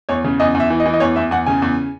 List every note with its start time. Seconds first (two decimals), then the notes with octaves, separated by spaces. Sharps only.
0.09 E2 C#5
0.24 C#3
0.40 E2 D#5
0.55 E2
0.60 E5
0.70 E3
0.80 D#5
0.86 E3
0.94 D#5
1.00 E2 C#5
1.16 E2 E5
1.31 E2 F#5
1.46 C#3 G#5
1.62 E2